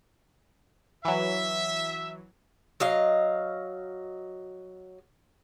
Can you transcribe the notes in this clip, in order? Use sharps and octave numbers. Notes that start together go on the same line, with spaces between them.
E3 F#3 E5
F#3 D#5 F5